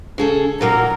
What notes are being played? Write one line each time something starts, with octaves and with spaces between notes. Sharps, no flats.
C#3 G#4 A4
A#2 F#3 A#3 A#4